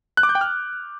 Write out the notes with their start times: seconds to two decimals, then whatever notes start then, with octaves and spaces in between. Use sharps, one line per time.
0.17 F#6
0.23 D6
0.29 G6
0.35 G5
0.41 F6